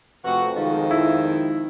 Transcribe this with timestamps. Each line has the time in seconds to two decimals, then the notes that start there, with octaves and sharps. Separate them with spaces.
0.25 F2 C3 A3 F#4 B4
0.56 D#3 F3 G#3 D#4 F5
0.91 D#4 E4